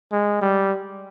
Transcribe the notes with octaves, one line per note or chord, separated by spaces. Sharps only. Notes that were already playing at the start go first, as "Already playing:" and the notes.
G#3
G3